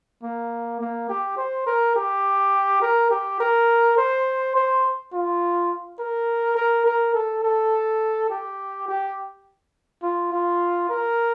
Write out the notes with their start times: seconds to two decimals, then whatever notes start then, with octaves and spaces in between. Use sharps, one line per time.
0.23 A#3
0.80 A#3
1.09 G4
1.37 C5
1.67 A#4
1.96 G4
2.82 A#4
3.11 G4
3.40 A#4
3.97 C5
4.55 C5
5.13 F4
5.99 A#4
6.57 A#4
6.86 A#4
7.14 A4
7.43 A4
8.30 G4
8.88 G4
10.03 F4
10.32 F4
10.89 A#4